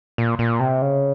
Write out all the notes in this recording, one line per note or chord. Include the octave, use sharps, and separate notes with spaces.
A#2
A#2
C3
C#3